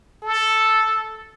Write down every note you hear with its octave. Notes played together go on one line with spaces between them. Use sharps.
A4